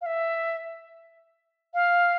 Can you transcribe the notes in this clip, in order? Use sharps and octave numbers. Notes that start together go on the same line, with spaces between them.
F5
E5
F5